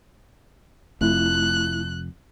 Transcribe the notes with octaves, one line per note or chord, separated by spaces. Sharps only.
F1 F2 A3 E4 F#6